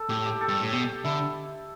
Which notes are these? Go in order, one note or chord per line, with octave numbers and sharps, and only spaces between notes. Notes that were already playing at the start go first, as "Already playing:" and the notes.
Already playing: A4
A2 G4
G4
A4
G2
A2
B2 G4
D3 E4